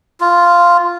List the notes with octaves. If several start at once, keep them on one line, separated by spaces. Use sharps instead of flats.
F4